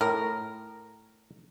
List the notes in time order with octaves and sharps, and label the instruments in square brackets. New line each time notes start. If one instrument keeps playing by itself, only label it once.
[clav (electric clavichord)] A2 [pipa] A#4